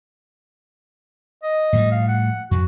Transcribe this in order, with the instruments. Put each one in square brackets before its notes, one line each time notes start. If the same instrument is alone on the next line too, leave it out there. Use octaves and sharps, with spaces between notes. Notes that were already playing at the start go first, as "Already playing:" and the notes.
[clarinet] D#5
[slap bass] A2 F3 G3
[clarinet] F5
F#5
[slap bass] F2 [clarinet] F#4